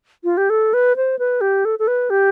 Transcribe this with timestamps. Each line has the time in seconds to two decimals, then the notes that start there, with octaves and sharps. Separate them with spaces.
0.24 F4
0.37 G4
0.50 A4
0.73 B4
0.96 C5
1.19 B4
1.41 G4
1.65 A4
1.79 A4
1.87 B4
2.10 G4